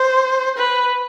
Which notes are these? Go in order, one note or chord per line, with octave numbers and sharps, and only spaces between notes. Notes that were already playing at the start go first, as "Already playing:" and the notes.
Already playing: C5
B4